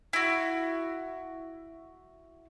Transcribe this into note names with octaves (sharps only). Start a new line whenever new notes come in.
E4 F#4